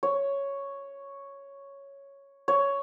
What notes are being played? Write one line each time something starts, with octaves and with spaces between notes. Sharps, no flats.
C#5
C#5